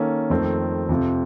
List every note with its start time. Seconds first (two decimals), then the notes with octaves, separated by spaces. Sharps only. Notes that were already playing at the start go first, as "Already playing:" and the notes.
Already playing: D#3 A#3 C#4 A4
0.30 F2 D#3 A3 C4
0.89 F2 C3 F3 C4